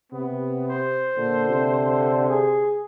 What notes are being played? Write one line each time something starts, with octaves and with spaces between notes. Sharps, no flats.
C3 B3
C5
A#2 D3
C3
G#4